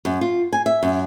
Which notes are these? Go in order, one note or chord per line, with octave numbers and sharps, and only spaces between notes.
F#2
F4
G#5
E5
F#2